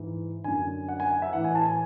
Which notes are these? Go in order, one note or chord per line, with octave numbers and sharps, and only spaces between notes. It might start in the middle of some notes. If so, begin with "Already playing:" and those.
Already playing: G#2 E3
F#2 D3 G#5
F#5
G#5
F#5
E5
A2 E3 F#5
G#5
A5
G#5